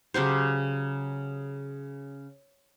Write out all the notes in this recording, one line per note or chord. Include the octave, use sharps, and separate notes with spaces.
C#3 F#3 G4 C5